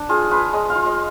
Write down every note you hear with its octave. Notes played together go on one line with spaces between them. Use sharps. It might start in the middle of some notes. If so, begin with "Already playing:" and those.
Already playing: D4
F4 G#4
F4 B4
G#3 D#5
F5
F4
D#5